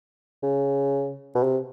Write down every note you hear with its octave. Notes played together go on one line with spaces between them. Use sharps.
C#3
B2
C3